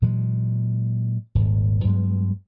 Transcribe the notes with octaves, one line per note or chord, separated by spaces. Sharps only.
A#2 E3 F#3 G#3
D#1 G#1 G#2
G2 F#3 G#3 B3